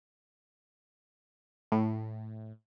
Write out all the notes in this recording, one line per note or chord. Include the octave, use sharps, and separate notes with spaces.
A2